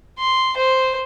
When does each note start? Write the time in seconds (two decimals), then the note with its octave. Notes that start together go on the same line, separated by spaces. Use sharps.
0.19 C6
0.57 C5